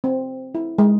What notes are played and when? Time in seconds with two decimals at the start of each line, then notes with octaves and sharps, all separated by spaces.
0.04 C4
0.55 E4
0.78 G#3